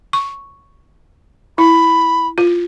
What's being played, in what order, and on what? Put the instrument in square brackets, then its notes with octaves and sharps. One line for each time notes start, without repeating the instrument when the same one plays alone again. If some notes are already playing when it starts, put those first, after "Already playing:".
[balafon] C#6
[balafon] E4 [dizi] B5
[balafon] F4